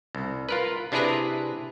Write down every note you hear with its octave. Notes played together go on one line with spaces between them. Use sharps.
C2
F4 A#4 B4
C3 D4 E4 G#4 B4 A#5